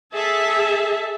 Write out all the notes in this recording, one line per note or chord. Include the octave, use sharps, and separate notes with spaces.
G#4 A4 E5 A5